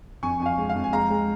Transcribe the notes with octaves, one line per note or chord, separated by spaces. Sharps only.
F2 G#5 C#6
F2 G#5
F5
G#3
F5
F2
G#5
G#3 F5 A#5
G#3